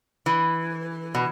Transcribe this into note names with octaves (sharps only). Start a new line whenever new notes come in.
E3
B2